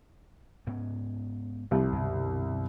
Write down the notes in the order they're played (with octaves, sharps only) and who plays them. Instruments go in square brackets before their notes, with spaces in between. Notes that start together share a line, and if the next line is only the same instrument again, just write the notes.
[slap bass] G#2 B3 C#4
[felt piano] C2 [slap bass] C3 F3
[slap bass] F#2 B2 D3